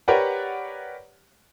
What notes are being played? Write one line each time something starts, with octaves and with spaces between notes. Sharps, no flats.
G4 A#4 B4 C#5 D5 F#5